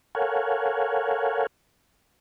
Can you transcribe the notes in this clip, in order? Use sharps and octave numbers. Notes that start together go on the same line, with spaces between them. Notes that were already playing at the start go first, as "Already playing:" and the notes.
A4 A#4 C#5 F5 F#5 G#5